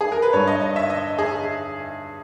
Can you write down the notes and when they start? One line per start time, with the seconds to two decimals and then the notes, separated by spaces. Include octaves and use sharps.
0.01 G#4
0.12 A#4
0.22 B4
0.33 G2 G3 C#5
0.47 D#5
0.62 D#5
0.76 E5
0.90 D#5
1.18 G#4